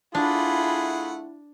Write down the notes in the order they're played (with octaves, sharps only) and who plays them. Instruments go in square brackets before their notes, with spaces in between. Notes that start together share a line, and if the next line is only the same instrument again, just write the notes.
[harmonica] A3 G#4 F#5 [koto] D4 [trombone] E4 [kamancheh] F4 B5